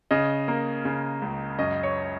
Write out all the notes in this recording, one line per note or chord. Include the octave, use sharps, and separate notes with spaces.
C#3 D#5
A#3
C#3
C#2
F#2 D#5
C#5